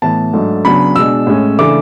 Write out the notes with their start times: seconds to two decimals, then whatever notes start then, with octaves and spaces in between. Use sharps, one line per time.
0.02 A2 E3 B3 A5
0.33 G#2 F#3 A3 D4
0.65 C#3 F#3 B3 D4 B5
0.96 B2 G#3 D4 E6
1.27 A2 G#3 C#4
1.58 C#3 E3 A3 D4 D6